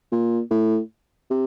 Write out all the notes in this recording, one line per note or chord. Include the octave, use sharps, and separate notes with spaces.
A#2
A2
C3